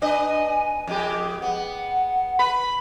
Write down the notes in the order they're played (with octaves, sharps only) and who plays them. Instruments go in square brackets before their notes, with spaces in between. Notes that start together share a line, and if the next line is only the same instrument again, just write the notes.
[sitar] D4 B4 D#5 [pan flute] G#5
[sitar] F2 G#3 G4
[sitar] B3 [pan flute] F#5
[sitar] B4 [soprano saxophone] B5